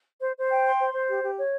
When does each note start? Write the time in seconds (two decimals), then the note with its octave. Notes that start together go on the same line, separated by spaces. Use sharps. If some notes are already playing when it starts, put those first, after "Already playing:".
0.22 C5
0.37 C5
0.50 G5
0.66 C6
0.80 C5
0.94 C5
1.09 G4
1.23 G4
1.38 C#5